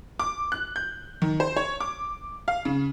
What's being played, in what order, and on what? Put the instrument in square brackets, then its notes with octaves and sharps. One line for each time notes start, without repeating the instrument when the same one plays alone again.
[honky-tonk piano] D6
F#6
G6
D#3
C5
C#5
D6
F5
C#3